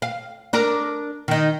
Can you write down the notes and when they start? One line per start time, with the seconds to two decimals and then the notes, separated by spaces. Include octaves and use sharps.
0.02 F5
0.53 D4 A#4
1.28 D#3 D#4